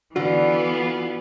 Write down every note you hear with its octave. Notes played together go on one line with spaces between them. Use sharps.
D3 E3 B3 F4 F#4